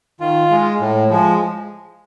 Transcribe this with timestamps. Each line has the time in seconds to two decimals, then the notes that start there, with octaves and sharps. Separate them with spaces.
0.20 D#3 F4
0.50 G#3
0.80 A2
1.09 F3 G#3